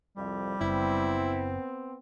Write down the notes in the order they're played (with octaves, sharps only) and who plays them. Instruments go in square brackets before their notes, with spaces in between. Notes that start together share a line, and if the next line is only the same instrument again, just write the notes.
[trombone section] C2 F2 [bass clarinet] G3
[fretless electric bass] F#1 [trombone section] B3 C4 [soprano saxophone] E4